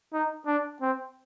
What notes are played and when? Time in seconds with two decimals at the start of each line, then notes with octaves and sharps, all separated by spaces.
0.13 D#4
0.47 D4
0.81 C4